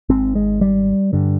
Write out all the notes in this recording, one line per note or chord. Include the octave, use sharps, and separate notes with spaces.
G#1 G#2 C4
G#3
G3
G2 D3